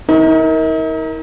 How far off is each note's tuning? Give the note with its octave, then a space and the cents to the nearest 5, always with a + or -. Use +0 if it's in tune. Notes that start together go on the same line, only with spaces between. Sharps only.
D#4 +45 A#4 +0